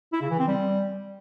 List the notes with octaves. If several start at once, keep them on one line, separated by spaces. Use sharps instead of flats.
E4
C#3
E3
C4
G3